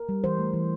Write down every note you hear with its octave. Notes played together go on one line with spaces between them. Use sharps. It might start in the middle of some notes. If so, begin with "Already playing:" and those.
Already playing: A#4
G3
E3 C5
A3
E3